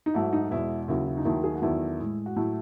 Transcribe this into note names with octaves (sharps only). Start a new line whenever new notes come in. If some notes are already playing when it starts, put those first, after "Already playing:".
D#4
G#2 F#3 A3 E4
D#4
F#4
E2 B2 G#3 E4
D#2 C#3 F#3 E4
E4
D#4
D#2 D#3 F#3 A3 E4
G#4
F#4
E2 D#3 F#3 A3 E4
A2 G#3
F#4
A2 F#3 A3 E4